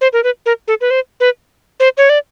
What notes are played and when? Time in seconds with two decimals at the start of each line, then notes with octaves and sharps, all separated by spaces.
0.01 C5
0.13 A#4
0.24 B4
0.46 A#4
0.68 A4
0.81 B4
0.91 C5
1.20 B4
1.80 C5
1.98 C#5
2.09 D5